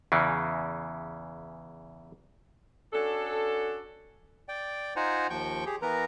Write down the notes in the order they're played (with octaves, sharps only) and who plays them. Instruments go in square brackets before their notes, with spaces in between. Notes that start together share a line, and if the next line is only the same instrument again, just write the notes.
[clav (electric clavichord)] E2 C#3 E3
[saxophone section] C#4 D4 F#4 A4
[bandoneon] D5 G5
D#4 F4 C5 F#5 G#5 A#5
D#2 F3 G5 C#6 G6
G4 G#4
E3 B3 A#4 B4 A#5